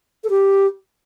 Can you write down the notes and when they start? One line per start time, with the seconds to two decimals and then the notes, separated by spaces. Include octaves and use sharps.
0.24 A4
0.30 G4